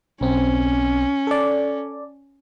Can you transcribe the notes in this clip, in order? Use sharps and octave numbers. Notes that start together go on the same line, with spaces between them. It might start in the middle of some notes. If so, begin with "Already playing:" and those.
B1 C4 C#4
A4 D5